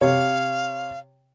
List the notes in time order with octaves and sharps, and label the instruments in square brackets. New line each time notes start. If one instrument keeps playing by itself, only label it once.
[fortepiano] C3 C#5 [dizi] F5